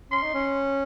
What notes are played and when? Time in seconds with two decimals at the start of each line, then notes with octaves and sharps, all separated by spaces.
0.11 C#4 C6
0.23 D#4
0.34 C#4